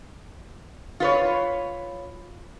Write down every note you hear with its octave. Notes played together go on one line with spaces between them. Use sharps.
F4 B4 C#5